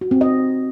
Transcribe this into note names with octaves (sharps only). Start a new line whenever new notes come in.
F#4
C4
D#5